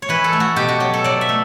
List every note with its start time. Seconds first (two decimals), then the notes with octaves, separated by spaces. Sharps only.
0.02 C#5
0.09 E3 B4
0.24 A4
0.33 A3
0.40 F#4
0.56 B2 G4
0.69 F#4
0.80 F#3 G4
0.94 A4
1.04 F#3 D5
1.21 E5
1.29 A3